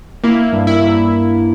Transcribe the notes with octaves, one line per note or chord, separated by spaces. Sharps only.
A#3 E4
G2
E4